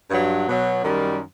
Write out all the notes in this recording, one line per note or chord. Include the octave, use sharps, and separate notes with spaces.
G2 F#3
B2 F#3
F#2 D#3 G3